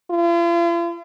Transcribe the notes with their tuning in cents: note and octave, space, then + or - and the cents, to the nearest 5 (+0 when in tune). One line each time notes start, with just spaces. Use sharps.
F4 -45